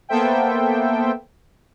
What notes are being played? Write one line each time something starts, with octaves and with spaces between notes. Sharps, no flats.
A#3 B3 A4 C5 E5 G5